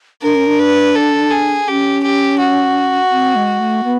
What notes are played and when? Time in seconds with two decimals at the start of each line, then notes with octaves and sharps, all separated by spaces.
0.22 D4 A#4
0.35 C#4
0.47 D4
0.59 B4
0.95 A4
1.31 G#4
1.67 C#4 G4
2.03 G4
2.39 F#4
3.11 C4
3.36 G#3
3.60 A3
3.84 B3